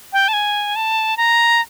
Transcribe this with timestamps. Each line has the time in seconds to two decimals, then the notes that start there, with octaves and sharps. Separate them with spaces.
0.13 G5
0.28 A5
0.33 G#5
0.76 A5
1.17 A#5